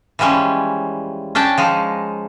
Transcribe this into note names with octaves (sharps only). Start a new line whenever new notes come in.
E3 F3 G3 G#3 C#4
C#4 D4 G5 A5
F3 G#3 D#4